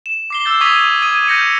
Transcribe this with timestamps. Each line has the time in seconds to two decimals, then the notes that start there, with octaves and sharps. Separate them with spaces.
0.06 E7
0.30 D6 C7 G7
0.45 D6 E6 G6 A6
0.61 C#6 D#6 G#6 B6 D#7 F7
1.02 D#6 G#6 D#7
1.28 F6 G6 A#6 C#7